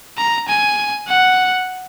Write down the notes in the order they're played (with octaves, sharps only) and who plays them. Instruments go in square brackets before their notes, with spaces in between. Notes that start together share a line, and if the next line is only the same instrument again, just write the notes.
[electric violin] A#5
G#5
F#5